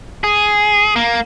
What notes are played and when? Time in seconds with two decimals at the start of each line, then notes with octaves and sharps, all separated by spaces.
0.24 G#4
0.96 A#3